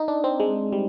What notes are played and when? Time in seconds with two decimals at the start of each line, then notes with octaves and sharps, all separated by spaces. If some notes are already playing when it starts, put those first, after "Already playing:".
Already playing: D#4
0.08 D4
0.24 C4
0.40 G#3
0.73 G3